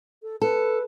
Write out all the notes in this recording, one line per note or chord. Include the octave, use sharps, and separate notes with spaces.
A4
A4 B4